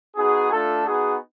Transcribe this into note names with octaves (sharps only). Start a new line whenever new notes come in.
B3 D#4 F#4 G#4
A3 D4 F4 A4
B3 D#4 F#4 G#4